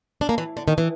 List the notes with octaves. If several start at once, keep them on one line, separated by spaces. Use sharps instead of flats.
D4
A#3
E3
D3
D#3
E3